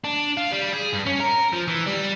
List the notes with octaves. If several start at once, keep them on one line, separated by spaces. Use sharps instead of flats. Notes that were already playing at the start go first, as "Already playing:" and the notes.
D4
F4
G3
G#4
G2
C#4
A#4
F3
E3
G3